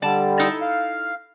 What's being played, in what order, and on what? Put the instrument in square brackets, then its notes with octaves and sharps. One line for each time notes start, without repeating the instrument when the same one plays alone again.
[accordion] D3 G3 [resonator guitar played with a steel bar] D5 A5
[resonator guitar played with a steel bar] D#4 E4 A4
[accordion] F5